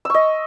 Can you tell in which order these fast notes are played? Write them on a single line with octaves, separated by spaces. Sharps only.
E6 C#6 D#5